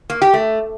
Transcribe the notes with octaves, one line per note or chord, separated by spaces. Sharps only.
A#3
G4
A3